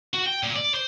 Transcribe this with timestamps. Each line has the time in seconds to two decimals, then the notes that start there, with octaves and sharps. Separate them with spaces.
0.14 F#4
0.26 G5
0.43 A#2
0.56 D5
0.74 C5